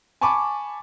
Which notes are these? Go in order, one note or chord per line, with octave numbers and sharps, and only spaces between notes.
G#5 A5 B5 C#6 D6